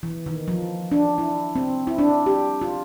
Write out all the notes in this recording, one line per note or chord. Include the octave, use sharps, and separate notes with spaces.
E3
D#3
F3
D4
E4
C4
E4
D4
G4
F4